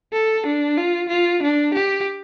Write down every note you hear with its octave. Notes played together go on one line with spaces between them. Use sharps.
A4
D4
F4
F4
D4
G4